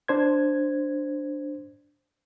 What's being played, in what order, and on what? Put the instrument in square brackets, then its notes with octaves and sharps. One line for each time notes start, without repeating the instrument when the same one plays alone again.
[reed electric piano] D4 C5 G#6